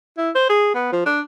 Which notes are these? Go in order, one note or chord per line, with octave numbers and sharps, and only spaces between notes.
E4
C5
G#4
B3
F3
D4